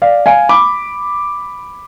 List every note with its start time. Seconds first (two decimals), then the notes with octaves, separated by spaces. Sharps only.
0.02 D5 F5
0.26 F5 G#5
0.49 B5 D6